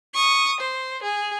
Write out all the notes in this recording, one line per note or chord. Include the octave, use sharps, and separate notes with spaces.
C#6 D#6
C5
G#4